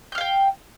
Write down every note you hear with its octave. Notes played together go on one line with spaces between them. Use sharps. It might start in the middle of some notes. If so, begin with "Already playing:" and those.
F5 G5 F6 G6